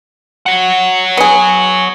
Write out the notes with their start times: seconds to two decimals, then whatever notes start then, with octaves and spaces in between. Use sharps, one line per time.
0.46 C#5 F#5
1.17 B3 G#4